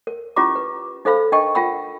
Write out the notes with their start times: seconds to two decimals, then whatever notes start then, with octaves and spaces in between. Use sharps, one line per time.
0.07 A#4
0.36 C#4 E4 F4 G4 A#5 D6
0.55 B4
1.05 D#4 A4 C5 F5 B5 E6
1.32 D4 A#4 D#5 G5 A5 C#6
1.55 F4 A#4 F#5 G5 B5 E6